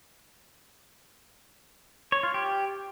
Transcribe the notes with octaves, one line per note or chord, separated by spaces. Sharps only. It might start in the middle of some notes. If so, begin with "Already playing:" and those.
C#5
F4
G4